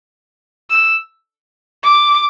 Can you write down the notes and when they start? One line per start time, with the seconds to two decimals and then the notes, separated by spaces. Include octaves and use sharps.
0.71 E6
1.84 D6